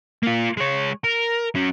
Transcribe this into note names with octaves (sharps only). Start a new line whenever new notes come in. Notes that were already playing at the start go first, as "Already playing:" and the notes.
A#3 F4
G#3 C#5
A#4
F#3 C#4